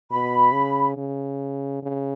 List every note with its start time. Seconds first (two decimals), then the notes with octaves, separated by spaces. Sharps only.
0.11 B2 B5
0.53 C#3
0.97 C#3
1.83 C#3